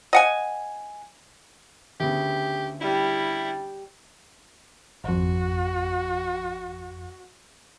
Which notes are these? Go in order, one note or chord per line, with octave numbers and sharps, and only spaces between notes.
D#5 F#5 G#5
D2 C#3 B3 G4
G3 E4
G#1 F2 F#4